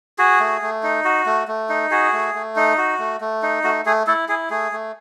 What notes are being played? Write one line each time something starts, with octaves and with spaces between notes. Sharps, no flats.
F#4 G#4
A3
A3
D#4
F#4
A3
A3
D#4
F#4 G#4
A3
A3
D#4
F#4
A3
A3
D#4
A3 F#4
A3 G#4
A3 E4 A4
E4 G#4
A3 G#4
A3